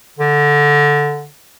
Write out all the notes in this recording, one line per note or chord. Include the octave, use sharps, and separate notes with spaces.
D3